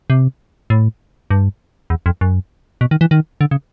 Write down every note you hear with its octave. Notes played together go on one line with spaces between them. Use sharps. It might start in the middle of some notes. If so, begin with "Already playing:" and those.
C3
A2
G2
E2
F2
F#2
B2
D#3
E3
D#3
D3
C#3